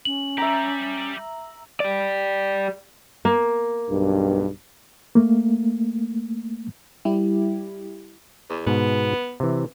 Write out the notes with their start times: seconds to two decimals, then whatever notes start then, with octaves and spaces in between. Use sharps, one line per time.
0.05 C#4 F#7
0.38 G3 G4 E5 A#5
1.80 G4 D5
3.25 A#3
3.89 B1 G2
5.15 A3 A#3
7.05 G3 E4 G4
8.50 E2
8.66 G#2 B2 B3
9.40 C3 E3